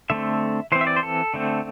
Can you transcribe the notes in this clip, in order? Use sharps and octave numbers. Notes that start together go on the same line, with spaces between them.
D3 A3 C4 E5
E3 C4 C5
E5
D5
C5
A4
D3 A3 C4